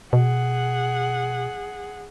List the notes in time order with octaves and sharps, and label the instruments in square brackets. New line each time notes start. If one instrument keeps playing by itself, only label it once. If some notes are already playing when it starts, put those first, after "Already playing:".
[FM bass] B2 [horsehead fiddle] G#4 F#5